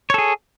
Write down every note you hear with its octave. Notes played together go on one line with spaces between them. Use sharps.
G#4 A4 C#5